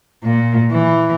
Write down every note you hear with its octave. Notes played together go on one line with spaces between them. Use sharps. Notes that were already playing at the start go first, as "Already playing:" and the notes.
A#2
E3